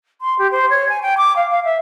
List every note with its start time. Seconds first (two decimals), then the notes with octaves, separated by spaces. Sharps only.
0.21 C6
0.39 G4
0.52 C5
0.70 C#5
0.89 G#5
1.02 G5
1.17 D6
1.36 F5
1.50 F5
1.65 E5